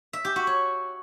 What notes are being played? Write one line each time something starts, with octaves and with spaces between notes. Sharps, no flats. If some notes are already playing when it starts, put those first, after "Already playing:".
E5
G4
F#4
C#5